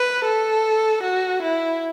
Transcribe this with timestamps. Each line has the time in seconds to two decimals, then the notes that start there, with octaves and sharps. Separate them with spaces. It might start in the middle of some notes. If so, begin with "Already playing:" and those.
Already playing: B4
0.24 A4
1.03 F#4
1.42 E4